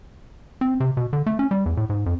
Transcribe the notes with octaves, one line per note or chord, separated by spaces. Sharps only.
C4
C3
B2
D3
A3
C#4
G3
E2
A2
G#2
F2